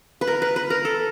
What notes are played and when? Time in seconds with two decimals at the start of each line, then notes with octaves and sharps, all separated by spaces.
0.21 B4
0.27 A#4
0.42 B4
0.56 B4
0.70 A#4
0.85 A4